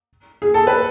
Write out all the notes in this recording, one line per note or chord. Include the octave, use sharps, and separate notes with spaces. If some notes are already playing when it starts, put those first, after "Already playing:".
G#4
A4
B4